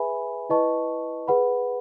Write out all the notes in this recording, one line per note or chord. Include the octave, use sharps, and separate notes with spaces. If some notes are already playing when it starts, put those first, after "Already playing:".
Already playing: G#4 B4 E5 G#5 B5
E4 B4 D#5 A5 C#6
G#4 B4 F#5 B5